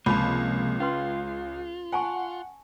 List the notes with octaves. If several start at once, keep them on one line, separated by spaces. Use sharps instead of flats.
C#2 C3 F3 A#3 A5 B5
C#4 F4 B4 C6
F#5 G#5 A5 C#6